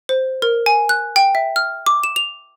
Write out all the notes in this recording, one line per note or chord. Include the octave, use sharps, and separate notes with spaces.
C5
A#4
G#5
F#6
G5
E5
F6
D6
E7
F7